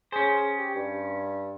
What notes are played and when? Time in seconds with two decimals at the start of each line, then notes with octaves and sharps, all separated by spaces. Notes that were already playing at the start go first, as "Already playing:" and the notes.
0.12 C#4 G#4 C5
0.58 G4
0.75 G2